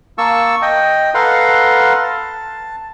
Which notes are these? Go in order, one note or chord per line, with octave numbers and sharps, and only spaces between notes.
A#3 A5 C#6 E6
D#5 G5
A4 B4 F5 F#5 A#5 C6
A5